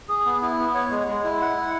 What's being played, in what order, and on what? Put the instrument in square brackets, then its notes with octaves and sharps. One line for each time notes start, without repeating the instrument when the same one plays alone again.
[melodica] G#4
B3
E4
B3
C#5
G#3
G#3
E4
F#5
E4